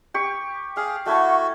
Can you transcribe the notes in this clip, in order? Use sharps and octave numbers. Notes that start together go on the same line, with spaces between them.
G4 C#6
G#4 F5
A3 E4 F#4 F#5 A5 C#6